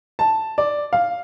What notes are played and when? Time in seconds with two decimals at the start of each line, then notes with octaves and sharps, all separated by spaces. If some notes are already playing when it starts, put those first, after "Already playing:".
0.19 A5
0.58 D5
0.93 F5